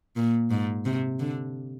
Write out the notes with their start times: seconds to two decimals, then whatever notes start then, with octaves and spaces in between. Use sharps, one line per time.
0.16 A#2
0.51 G#2
0.85 C3
1.19 D3